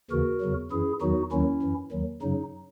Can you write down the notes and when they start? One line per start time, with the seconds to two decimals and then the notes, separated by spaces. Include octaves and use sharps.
0.11 D#2 C#3 E3 F#4 A#4
0.41 E2 C#3 F#3
0.71 F#2 E3 E4 G#4
1.01 E2 D#3 F#3 D#4 F#4
1.32 D#2 D#3 F#3 C#4 E4
1.62 F#2 E3
1.92 D#2 D#3 F#3
2.22 F#2 C#3 F#3 D#4